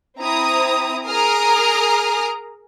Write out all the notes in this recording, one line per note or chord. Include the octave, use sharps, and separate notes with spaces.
C4 E4 A#5 D#6
G#4 A#4 A#5 D#6 F6